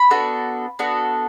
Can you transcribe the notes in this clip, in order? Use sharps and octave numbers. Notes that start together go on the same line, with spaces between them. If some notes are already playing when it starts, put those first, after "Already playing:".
Already playing: B5
B3 D4 F#4 A4
B3 D4 F#4 A4